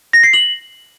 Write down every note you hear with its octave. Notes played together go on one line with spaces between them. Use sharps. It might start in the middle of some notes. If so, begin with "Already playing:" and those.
A#6
C7
F#7